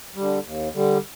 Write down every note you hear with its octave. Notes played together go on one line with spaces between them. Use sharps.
D3 G3
D#2
D3 G3